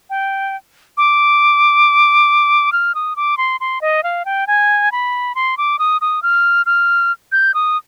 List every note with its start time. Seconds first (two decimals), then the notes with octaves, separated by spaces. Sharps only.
0.10 G5
0.97 D6
2.72 F6
2.95 D#6
3.16 D6
3.38 C6
3.61 C6
3.81 D#5
4.04 F5
4.25 G5
4.47 G#5
4.92 B5
5.35 C6
5.58 D6
5.79 D#6
6.01 D#6
6.23 F6
6.66 F6
7.32 G6
7.54 D#6